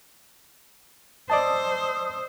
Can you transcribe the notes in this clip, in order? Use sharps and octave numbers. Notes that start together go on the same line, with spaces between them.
C5 D5 D#5 A5 D#6 E6